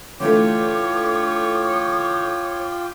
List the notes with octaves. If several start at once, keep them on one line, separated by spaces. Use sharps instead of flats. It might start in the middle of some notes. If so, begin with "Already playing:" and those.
D3 E3 A3 F4 C#5 G5 D6